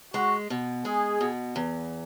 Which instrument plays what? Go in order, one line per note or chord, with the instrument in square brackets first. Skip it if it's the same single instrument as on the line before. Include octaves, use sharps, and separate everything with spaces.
[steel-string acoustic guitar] G#3 [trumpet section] F#4
[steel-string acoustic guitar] B2
[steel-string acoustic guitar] G#3 [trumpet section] G#4
[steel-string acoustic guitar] B2
E2